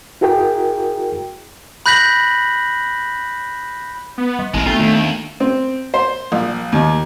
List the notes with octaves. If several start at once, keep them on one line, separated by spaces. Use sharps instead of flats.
E4 F#4 G#4 A#4 G5
B5 F#6 G6 A#6 B6 F#7
B3
G3
A1 G#3 C4 A#4
A3 B3 D4 F4
D#2
C4
C5
A#1
D#2